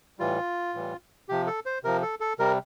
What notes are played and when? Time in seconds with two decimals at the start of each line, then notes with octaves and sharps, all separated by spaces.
0.19 A2 E3 G3 F4
0.74 A2 E3 G3
1.29 C3 F3 G4
1.47 A4
1.66 C5
1.84 C3 F3 A#4
2.02 A4
2.20 A4
2.39 C3 G3 A#4